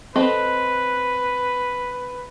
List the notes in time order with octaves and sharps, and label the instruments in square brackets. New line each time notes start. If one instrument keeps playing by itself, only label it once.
[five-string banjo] C4 A4 D#5 [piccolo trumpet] B4